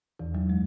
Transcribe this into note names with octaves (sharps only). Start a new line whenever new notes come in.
E2 E3
F#2 F#3
G#3